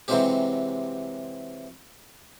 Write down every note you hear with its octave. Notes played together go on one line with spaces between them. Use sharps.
C3 E3 F#3 G#3 C4 G4